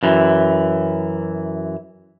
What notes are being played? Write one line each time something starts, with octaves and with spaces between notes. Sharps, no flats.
F#2 E3